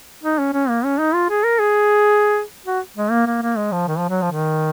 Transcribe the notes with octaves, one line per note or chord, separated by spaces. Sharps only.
D#4
C#4
C#4
A#3
C#4
D#4
F4
G#4
A#4
G#4
F#4
G#3
A#3
A#3
A#3
G#3
F3
D#3
F3
F#3
F3
D#3